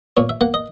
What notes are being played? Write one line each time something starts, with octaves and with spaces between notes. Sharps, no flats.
A#2 C#5
E5
A#3 F#5
D#5